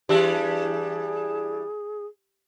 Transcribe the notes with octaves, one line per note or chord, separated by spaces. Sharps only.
E3 G3 D4 G4 G#4 E5 E6